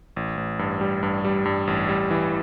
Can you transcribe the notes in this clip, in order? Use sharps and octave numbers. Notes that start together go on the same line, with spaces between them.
A1
A1
G2
G3
G2
G3
G2
A1
G3
E3